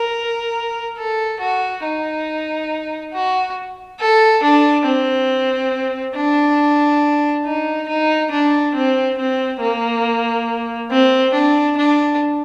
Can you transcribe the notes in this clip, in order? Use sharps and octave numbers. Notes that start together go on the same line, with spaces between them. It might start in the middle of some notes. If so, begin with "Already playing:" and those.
Already playing: A#4
A4
F#4
D#4
F#4
A4
D4
C4
D4
D#4
D#4
D4
C4
C4
A#3
C4
D4
D4